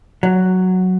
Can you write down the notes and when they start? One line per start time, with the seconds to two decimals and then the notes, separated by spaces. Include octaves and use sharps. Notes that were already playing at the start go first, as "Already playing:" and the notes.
0.23 F#3